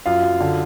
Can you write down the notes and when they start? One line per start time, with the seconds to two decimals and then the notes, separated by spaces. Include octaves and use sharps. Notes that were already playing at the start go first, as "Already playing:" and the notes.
0.06 F#2 F4 F5
0.23 F#2
0.40 D3